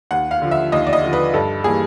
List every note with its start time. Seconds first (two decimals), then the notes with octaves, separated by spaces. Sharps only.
0.11 D#2 F#5
0.31 F5
0.42 D3 F3
0.51 E5
0.72 D#2 D#5
0.87 D5
0.93 D#5
1.03 D3 F3
1.13 B4
1.34 G2 A4
1.64 E3 G3 A#3 G#4